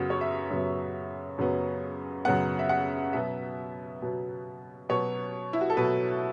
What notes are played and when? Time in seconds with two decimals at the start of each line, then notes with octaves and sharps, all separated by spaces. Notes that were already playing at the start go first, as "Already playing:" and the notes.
Already playing: F#2 C#3 F#3 B3 F#4
0.10 C#5
0.21 E5
0.50 F#2 C#3 F#3 B3
1.38 F#2 C#3 F#3 B3
2.25 F#2 C#3 F#3 B3 F#5
2.59 E5
2.69 F#5
3.13 B2 F#3 B3 E5
4.02 B2 F#3 B3
4.89 B2 F#3 B3 C#5
5.53 E4
5.61 F#4
5.70 A4
5.77 B2 F#3 B3 B4